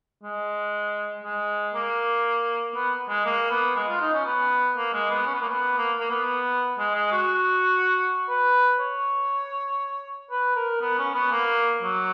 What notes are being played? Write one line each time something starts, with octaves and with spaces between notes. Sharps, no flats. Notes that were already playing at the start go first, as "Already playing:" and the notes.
G#3
G#3
A#3
B3
G#3
A#3
B3
G#3
F4
D#4
C#4
B3
A#3
G#3
B3
C#4
B3
A#3
B3
A#3
A#3
B3
G#3
G#3
F#4
B4
C#5
B4
A#4
B3
C#4
B3
A#3
F#3